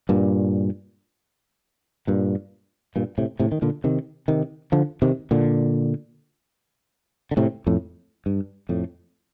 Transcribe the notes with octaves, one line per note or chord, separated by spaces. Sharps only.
G2 A#2
G2 A#2
G2 A#2
A2 C3
A2 C3
D#3
A#2 D3
C3 D#3
C3 D#3
D3 F3
C3 D#3
A#2 D3
D3
A2 C3
F2 A2
G2
F2 A2